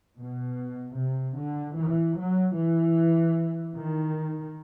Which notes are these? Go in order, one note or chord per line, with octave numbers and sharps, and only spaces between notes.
B2
C3
D3
E3
F#3
E3
D#3